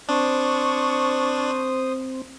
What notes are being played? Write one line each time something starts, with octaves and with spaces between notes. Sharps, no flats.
C4 D4 C5 C#6 D#6